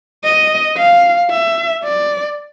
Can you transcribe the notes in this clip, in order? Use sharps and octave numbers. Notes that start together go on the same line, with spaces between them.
D#5
F5
E5
D5